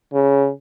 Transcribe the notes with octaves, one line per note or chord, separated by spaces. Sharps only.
C#3